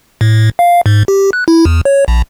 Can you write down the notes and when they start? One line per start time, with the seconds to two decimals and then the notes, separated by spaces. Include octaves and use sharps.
0.21 A2
0.59 F5
0.86 G#2
1.08 G4
1.33 F#6
1.48 E4
1.65 E2
1.85 C#5
2.08 A#1